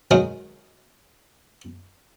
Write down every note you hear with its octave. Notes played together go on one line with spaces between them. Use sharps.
F#3 G#3 D#4 F#4 A#4